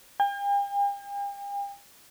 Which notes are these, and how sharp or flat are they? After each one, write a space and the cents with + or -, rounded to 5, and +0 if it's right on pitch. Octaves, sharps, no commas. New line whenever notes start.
G5 +45